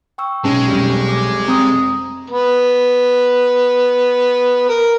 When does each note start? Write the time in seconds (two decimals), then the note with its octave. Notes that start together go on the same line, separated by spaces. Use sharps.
0.18 G5 C#6 E6
0.44 B1 G#3 C#4 A5
0.67 F1 G3
1.09 D6
1.48 C4 A#5 D#6
2.30 B3
4.69 A#4